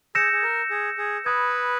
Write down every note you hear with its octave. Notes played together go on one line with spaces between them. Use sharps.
G#4 E6 G6 A#6 C#7 E7
G#4
A#4
G#4
G#4
B4 B5 D#6 G#6